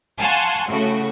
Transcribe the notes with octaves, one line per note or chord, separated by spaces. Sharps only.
F5 F#5 G#5 A5 C6 C#6
A2 C#3 A3 F#4